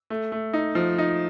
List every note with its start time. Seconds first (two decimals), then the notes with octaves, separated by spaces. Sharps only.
0.10 A3
0.32 A3
0.53 D#4
0.75 F3
0.98 D#4